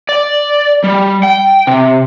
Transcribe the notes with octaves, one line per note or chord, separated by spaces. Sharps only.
D5
G3
G5
C3